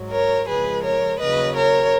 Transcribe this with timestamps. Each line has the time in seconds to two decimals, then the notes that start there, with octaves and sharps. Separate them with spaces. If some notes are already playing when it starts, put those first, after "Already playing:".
Already playing: G#2 F#3
0.11 A#4 C#5
0.47 F2 C#3 F3 G#3 G#4 B4
0.84 A#4 C#5
1.19 D#2 C#3 F#3 B4 D#5
1.55 A#4 C#5